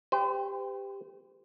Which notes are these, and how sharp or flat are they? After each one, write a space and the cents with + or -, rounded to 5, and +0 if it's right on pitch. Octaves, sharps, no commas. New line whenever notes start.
G4 +15 C5 -40